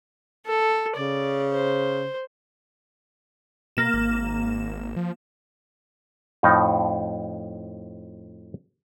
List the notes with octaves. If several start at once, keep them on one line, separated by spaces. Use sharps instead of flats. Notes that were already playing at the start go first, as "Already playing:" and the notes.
A4
C#3 D5
C5
B2 A#3 E7
G#1
F3
F2 A2 F3 D#4